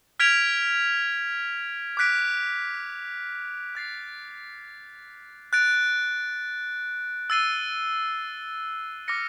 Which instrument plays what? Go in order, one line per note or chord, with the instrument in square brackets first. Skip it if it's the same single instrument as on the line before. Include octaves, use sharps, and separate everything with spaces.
[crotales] F6 G#6 B6 D7 F7
D6 F#6 B6 D7
F#6 A6 C7
F#6 A6 D7
E6 A6 C7 D#7 G7
D6 F6 A#6 C#7